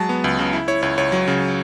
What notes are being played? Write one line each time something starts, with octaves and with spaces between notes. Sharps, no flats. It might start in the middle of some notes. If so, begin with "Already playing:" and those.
Already playing: F#3 G#3 A5
B3
C#2
C#3
E4
E4 C#5
C#2 C#5
C#2 C#5
F#3
C#3